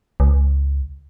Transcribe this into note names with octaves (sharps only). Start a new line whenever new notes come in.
C#2